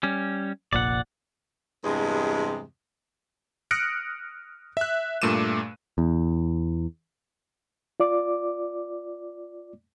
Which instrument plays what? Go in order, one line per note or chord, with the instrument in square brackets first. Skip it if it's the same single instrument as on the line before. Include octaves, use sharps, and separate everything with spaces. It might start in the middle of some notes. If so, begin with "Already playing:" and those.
[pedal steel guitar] G3 C#4
[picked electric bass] F1 A#1 A#2 [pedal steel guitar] D5 F#5
[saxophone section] E2 G2 C3 G#3
[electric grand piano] D#6 F6 F#6 A#6 C#7 D7
E5 F#6
G2 A#2 A3 D6 D#7 E7
[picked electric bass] E2
[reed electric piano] F4 D5 D6